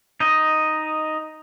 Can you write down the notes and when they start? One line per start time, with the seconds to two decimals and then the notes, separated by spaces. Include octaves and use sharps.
0.20 D#4 D#5